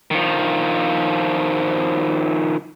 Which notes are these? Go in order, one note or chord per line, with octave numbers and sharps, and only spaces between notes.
D#3 F3